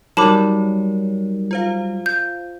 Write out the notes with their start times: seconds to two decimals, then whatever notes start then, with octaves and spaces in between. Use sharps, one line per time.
0.17 F#3 G3 D#4 A#4 C#5 A5 B5 D6
1.51 F4 C5 F5
2.06 G6